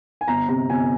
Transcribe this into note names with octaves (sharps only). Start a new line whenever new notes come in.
G#5
G1 A#5
C3 A#5
G1 G#5